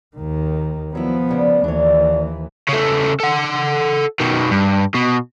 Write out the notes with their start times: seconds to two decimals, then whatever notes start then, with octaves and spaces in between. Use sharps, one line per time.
0.17 D#2 D#3
0.95 F3 F#3 B3 E4
1.29 D2 C#3 D4
1.64 D#2 E3 D4 C#5
2.69 C#3 A3
3.20 A4 F#5
4.20 B2 D#3
4.51 G2
4.94 B2